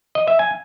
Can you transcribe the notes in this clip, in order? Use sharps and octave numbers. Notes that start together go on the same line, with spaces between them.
D#5
E5
G#5